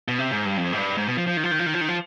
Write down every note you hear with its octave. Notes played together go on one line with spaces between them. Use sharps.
B2
C3
G#2
G2
F2
G#2
G2
G#2
B2
F3
F3
D#3
F3
D#3
F3
D#3
F3
D#3
F3